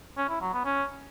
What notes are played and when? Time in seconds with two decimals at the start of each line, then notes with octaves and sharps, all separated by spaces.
0.17 C#4
0.29 E4
0.41 F#3
0.53 B3
0.65 C#4